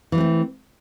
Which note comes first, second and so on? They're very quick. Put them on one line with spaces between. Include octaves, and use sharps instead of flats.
E3 G3 C4 A3